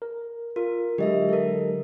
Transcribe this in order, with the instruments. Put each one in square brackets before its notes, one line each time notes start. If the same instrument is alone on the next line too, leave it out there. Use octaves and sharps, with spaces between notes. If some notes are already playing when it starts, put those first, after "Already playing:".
[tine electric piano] A#4
[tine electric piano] F4 [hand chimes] A#4
[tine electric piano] D3 F#3 G#3 [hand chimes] G4 D#5 E5
[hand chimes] A4 A#4